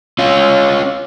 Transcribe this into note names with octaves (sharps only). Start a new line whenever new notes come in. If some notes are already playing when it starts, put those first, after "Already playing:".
C#4 F4